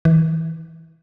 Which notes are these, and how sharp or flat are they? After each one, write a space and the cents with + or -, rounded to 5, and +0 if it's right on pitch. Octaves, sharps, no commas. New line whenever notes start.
E3 -30